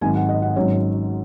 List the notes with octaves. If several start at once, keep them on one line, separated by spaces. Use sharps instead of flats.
G#1 G#2 F#3 G#5
F#5
D#5
F#5
G#1 G#2 F#3 C#4 C#5